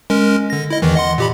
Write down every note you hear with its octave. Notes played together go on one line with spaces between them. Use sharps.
G#3 C#4 A#4
D3 A#6
E4 D#5
E2 D#3 E3
D#5 F#5 C6
A#2 G4 B5